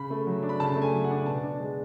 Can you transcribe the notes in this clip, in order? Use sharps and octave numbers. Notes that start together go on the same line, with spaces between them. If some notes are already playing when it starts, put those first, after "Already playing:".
Already playing: C#3 B5
A3
F#3
D4
B5
C#3 A5
A3
G#5
F#3
F#5
D4
B2 A5
D4
G#3